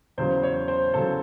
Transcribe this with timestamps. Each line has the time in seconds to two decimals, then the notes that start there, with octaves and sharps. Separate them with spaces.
0.18 E2 C#3 F#3 C5
0.43 C#5
0.68 C5
0.93 E2 C#3 F#3 A4